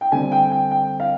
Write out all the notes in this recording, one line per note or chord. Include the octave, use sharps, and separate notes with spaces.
G5
D3 G3 C4 G#5
G5
G5
G5
F5